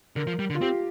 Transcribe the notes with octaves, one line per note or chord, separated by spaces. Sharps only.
D3 A#4
F3
G3
D3
F4
C4 G4